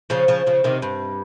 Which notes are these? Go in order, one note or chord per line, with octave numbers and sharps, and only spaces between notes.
C#3 F3
C#3 F3
C#3 F3
C3 D#3
G2